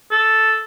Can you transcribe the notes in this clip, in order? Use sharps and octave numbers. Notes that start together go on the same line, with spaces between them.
A4